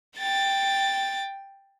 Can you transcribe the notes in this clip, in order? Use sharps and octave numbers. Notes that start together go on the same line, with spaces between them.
G5 A6